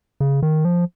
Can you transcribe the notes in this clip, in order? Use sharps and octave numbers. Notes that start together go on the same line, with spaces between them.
C#3
D#3
F3